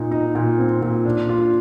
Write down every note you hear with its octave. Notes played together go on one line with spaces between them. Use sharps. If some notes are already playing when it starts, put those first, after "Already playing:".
Already playing: A#2 D#4
D#4
A#2
C4
A#2
D4
F4